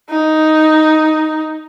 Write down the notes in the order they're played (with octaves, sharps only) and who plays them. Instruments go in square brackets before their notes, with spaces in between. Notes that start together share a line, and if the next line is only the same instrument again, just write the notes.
[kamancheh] D#4